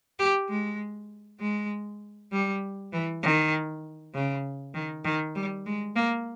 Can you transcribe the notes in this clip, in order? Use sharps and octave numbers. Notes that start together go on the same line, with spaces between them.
G4
G#3
G#3
G3
E3
D#3
C#3
D#3
D#3
G3
G#3
A#3